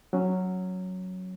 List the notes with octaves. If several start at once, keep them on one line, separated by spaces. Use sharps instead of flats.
F#3 C#4